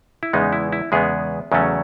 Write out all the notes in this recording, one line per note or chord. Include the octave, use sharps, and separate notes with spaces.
E4
E2 C#3 G#3 B3 D#4
E4
E4
E2 C#3 G#3 B3 G#4
E2 C#3 F#3 A3 C#4